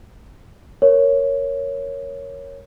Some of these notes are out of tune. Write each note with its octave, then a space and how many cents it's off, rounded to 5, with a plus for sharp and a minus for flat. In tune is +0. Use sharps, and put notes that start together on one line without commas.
A#4 +0 C#5 +0